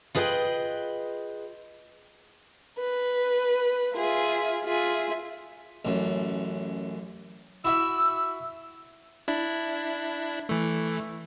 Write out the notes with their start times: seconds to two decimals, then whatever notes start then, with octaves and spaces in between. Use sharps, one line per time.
0.15 F4 G#4 B4 D#5 G5
2.78 B4
3.96 F4 G#4 E5
4.65 F4 G#4 E5
5.85 A1 F#2
7.65 E4 F#4 E5 E6
9.28 D4 E4
10.49 E3 A3